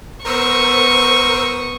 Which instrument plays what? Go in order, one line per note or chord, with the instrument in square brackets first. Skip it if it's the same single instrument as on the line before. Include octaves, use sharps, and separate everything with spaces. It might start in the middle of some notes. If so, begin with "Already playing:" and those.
[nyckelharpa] B3 D#6 [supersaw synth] A#4 C5 E6 [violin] C#6